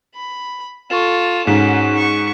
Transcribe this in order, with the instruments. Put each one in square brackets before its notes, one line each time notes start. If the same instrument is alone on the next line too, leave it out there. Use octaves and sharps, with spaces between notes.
[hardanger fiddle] B5
[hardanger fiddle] F4 A4 [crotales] C#6 E7
[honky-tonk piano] G#2 [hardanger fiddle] C#4 F#4 [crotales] B6 E7
[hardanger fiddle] C#6